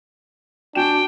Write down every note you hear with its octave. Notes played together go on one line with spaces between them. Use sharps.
D4 F#4 G5 G#5 E7